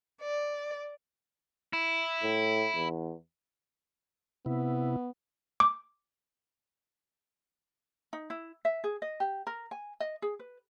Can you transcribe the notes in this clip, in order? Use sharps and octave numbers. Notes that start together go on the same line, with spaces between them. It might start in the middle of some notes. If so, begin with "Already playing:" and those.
D5
E4
A2
E2
C3 B3 E4
D6
D#4
E4
E5
G#4
D#5
G4
A#4
G#5
D#5
G#4
B4